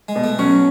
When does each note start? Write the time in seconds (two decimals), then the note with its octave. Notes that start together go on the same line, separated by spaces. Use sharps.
0.09 G#3
0.16 B2
0.24 A3
0.39 F#3 C#4